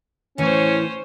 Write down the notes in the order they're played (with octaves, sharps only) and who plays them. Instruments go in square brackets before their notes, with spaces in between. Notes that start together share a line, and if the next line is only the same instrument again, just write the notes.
[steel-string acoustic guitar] A2 E3 [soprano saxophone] C#4 [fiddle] C5 C#5